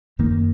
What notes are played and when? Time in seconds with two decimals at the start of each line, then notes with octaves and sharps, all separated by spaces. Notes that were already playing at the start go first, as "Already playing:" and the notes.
0.19 F#2 D#3 A#3